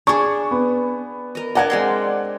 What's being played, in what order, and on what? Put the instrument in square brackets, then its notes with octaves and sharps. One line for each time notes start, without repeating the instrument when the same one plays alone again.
[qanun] D4 G#4 [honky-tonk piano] C#6
[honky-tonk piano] B3
[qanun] A#4 D#5
[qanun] D4 A#4 D#5 [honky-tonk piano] D5 F#5 G#6
[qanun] G#3 C4 C6